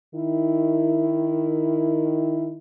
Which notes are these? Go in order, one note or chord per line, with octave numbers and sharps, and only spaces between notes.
D#3 E4